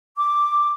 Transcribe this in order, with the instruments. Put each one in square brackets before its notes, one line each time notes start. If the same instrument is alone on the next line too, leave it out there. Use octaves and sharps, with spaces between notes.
[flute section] D6